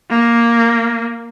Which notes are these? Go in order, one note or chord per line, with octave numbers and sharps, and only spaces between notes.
A#3